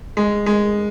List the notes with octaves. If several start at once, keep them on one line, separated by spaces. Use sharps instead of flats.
G#3
G#3